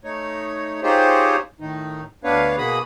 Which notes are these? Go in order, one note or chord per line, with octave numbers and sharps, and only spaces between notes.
A3 D#4 C#5
D#4 F4 G4 G#4 C5 C#5
A2 D#3 D#4
D2 B3 D4 B4 C#5 F5
B2 A#3 F#4 G#4 B5 D#6